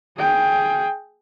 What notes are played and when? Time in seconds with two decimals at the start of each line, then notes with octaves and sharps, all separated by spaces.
0.18 G#4 G5